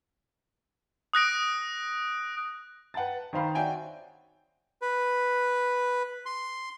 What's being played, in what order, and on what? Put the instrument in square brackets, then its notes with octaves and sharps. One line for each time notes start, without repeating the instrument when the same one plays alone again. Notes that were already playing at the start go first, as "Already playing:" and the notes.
[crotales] D#6 F#6 A#6 D7
[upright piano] B4 F#5 G5 A5 A6
D#3 D#4 C5 F5 B5
F#4 C#5 D5 E5 G5 G#5
[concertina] B4
C6